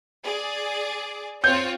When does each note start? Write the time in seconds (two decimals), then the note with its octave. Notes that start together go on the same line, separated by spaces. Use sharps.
0.24 G#4 D5
1.44 C4 F4 C#5 G6